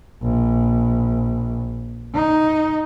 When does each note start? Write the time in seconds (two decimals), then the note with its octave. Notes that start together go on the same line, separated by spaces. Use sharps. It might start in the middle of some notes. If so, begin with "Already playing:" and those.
0.22 A#1
2.14 D#4